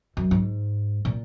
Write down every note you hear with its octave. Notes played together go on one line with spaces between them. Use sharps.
F#2
G#2
A#2